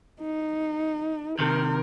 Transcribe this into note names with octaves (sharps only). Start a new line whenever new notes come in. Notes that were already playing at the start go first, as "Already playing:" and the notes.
D#4
C3 D#3 A#4